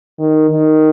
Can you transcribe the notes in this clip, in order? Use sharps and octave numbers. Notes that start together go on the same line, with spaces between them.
D#3
D#3